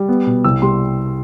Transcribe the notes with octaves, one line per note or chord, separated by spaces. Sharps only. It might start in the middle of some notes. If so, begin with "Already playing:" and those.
Already playing: G3
B3
B2
C2 E6
G3 C6